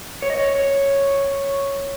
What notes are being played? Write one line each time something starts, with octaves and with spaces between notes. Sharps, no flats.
C#5
D#5
C#5
C#5